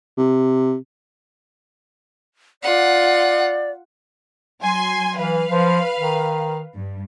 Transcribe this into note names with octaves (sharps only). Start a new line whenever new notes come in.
C3
F4 D5 F#5
F#3 G#5 C6
E3 B4 F5
F3
D#3
G2